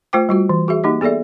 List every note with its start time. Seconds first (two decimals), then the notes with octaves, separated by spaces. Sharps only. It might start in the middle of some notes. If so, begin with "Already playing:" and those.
0.13 A3 F4 C5 G5 D6
0.29 G3 F4 F#4
0.49 E3
0.68 F#4 G#4 E5
0.84 A#3 D#4 G4 D#5
1.01 B3 G#4 A4 D5 E5